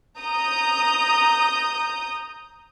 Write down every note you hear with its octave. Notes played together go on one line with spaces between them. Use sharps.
A#5 D#6 G6